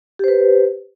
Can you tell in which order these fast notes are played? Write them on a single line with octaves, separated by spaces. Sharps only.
G4 C5 B4